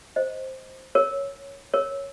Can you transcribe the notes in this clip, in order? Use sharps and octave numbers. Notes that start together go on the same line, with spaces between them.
C5 D#5
A#4 C#5
A#4 C#5